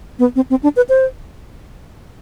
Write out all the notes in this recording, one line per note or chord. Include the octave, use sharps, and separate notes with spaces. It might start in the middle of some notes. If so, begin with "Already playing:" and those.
B3
C4
C4
D4
B4
C5